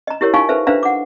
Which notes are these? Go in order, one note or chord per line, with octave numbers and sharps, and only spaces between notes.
D#5 A#5
E4 G4 A#4 C#5
D#4 F4 F5 G#5 C#6
A4 B4 C5 E5
D4 B4 C5 E5 F5 A#5
F#5 D6